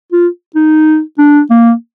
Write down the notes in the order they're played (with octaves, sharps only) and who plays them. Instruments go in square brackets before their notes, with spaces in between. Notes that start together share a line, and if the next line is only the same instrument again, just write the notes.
[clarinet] F4
D#4
D4
A#3